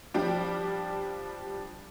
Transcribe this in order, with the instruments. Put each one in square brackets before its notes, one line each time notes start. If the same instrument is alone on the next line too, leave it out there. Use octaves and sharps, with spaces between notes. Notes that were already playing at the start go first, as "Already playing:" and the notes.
[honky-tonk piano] F3 G3 D4 G5